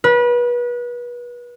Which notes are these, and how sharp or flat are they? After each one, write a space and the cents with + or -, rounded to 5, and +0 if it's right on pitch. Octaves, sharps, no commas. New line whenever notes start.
B4 -30